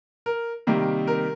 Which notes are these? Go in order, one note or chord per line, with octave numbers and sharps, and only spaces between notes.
A#4
C3 D#3 G3 A#3
A#4